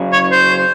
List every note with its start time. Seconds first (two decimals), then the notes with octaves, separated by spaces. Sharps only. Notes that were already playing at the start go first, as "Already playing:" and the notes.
Already playing: C#3 F#3 C#4 G#4
0.13 C#5
0.31 C5